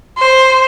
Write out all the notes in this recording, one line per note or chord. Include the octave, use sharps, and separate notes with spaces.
C5